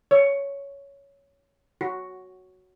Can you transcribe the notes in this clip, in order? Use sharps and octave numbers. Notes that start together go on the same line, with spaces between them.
C#5
F#4